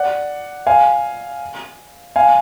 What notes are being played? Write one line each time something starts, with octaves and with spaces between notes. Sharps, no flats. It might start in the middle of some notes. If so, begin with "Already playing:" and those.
Already playing: D5 F#5
F5 G#5
F5 G#5